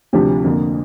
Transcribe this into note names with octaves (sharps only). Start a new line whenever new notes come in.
D2 C3 F3 D4 G4
F2 D3 A#3